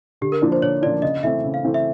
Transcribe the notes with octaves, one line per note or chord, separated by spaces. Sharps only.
D3 G4
A#4
F3 A#3 D4 F4
C5
D3 C#5
F3 A#3 D4 F4 D5
C#3 D#5
E3 A3 C4 E5
C#3
F5
E3 A3 C4
E5